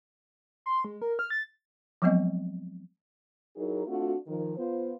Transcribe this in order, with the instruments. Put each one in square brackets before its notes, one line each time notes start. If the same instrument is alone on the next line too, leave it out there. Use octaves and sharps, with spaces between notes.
[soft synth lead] C6
G#3
A#4
F6
A6
[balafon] F3 F#3 G#3 B3 C4 D#5
[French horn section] F#3 D#4 E4 G#4 A#4
A3 C4 D4 F4 F#4
D#3 F3 A#4
B3 F4 C5